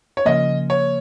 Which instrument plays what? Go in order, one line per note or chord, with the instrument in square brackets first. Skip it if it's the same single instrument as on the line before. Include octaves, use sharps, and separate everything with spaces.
[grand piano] C#5
[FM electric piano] C#3 F3 A#3 [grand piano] D#5
[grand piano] C#5